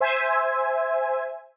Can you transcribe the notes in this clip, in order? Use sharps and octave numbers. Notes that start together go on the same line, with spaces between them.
C5 E5 G#5